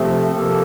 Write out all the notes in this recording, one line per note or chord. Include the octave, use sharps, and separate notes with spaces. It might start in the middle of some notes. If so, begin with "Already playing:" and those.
Already playing: C3 F3 A3 C4
C3 F3 A#3 A4